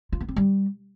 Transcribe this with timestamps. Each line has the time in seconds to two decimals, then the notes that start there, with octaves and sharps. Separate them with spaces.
0.12 F4
0.20 B3
0.28 C4
0.36 G3